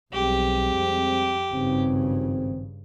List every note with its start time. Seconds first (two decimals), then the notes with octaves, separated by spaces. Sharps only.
0.13 B1 G3 G#3 C4 G4
0.75 F2
1.52 G#1 G2 C#3 C4